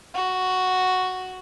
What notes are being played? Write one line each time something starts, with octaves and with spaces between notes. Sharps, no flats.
F#4